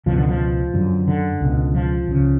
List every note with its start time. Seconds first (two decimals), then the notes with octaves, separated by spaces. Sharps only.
0.06 C#2 B2 F3
0.18 D3
0.29 F3
0.74 F#2 D3
1.08 D3
1.41 C#2 B2
1.74 F3
2.08 C#2 C#3